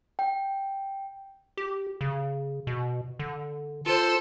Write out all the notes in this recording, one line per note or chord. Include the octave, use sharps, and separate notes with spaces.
G5
G4
C#3
B2
D3
F4 A4 C5